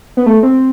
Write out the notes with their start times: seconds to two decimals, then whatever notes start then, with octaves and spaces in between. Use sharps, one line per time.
0.17 B3
0.26 A3
0.43 C4